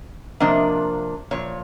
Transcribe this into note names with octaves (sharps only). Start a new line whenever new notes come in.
C3 F3 A#3 D4 D#5
A#2 F3 C#5